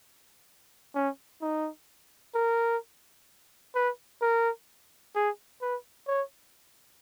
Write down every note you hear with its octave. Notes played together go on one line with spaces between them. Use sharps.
C#4
D#4
A#4
B4
A#4
G#4
B4
C#5